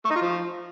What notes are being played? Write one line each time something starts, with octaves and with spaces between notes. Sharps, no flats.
A3
D#4
F4
F3